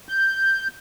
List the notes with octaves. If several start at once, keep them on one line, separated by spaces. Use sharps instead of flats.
G6